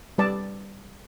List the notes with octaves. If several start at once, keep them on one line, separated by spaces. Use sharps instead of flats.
G3 B4 D5 A5